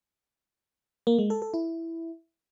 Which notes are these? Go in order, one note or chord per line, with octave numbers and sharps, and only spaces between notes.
A#3
G#3
A4
A4
E4